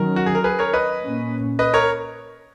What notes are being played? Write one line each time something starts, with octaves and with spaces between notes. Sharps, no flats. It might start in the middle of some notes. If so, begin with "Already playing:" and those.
Already playing: D#3 F#3 C#4 A#4
F#4
G#4
A#4
G#4 B4
A#4 C#5
B4 D#5
A#2 A#3 C#4
B4 D#5
A#4 C#5